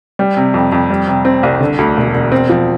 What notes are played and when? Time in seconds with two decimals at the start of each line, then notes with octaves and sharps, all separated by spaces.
0.19 G3
0.37 C3
0.54 F2
0.72 F2
0.90 G3
1.07 C3
1.25 C4
1.43 C2
1.61 D3
1.78 D2
1.97 E1
2.14 E1
2.32 C4
2.49 F3